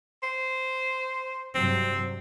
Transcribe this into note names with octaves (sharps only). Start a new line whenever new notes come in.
C5
G2 C3 F#3 C4